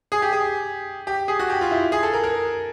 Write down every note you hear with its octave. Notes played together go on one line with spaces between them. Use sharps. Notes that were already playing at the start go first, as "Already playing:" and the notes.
G#4
G4
G#4
G4
G#4
F#4
G4
F4
E4
G#4
A4
A#4
A#4